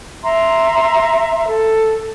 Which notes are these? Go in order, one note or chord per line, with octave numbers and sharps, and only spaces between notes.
E5 A#5 C6
A4